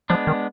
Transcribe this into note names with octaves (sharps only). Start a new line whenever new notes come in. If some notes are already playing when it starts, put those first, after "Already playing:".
F3 G#3 B3 D4
D#3